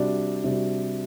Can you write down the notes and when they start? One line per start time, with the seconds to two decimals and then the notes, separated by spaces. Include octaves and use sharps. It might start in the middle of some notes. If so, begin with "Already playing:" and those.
Already playing: C3 G3 D4 F#4
0.44 C3 G3 D4 F#4